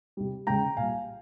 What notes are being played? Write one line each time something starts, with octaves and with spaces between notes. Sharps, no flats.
C3 G3
C#3 G#3 G5 A#5
A#2 G3 F5 G#5